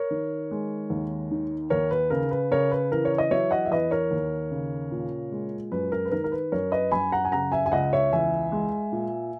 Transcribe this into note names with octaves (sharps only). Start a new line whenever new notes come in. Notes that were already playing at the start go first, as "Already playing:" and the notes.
Already playing: A#4 C#5
D#3
G#3
D#2
D#3
D#2 A#4 C#5
B4
C#3 A#4
B4
C#3 A#4 C#5
B4
E3 A#4
C#5
D#5
F#3 C#5 E5
D#5 F#5
E5
E2 B4 D#5
A#4 C#5
D#2
C#3
A#2
G#3
F#2 B4
A#4
B4
D#3 A#4
A#4
B4
F#2 A#4 C#5
B4 D#5
F#2 G#5 B5
F#5 A#5
G#5
C#3 F#5 A#5
E5 G#5
G#5
C#2 D#5 F#5
C#5 E5
E2 E5 G#5
G#3
A#2